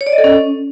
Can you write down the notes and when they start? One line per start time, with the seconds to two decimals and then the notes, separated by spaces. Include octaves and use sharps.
0.01 C#5
0.07 D5
0.12 D#5
0.18 A4
0.24 C#4